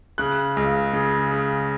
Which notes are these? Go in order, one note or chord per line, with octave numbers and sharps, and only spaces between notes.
C#3 F#6
C#2
C#3
C#3